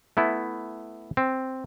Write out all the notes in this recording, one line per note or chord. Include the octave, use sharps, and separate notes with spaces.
A3 B3 E4
C4